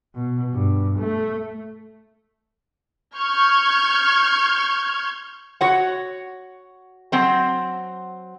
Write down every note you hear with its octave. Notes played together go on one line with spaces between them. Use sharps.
B2
G2
A3
C#6 F6 G6 G#6
F#4 C#5 F#5
F#3 C4 C5